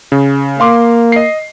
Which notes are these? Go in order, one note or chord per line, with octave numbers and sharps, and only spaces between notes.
C#3
A#3 F5 C6 D6
D#5 C7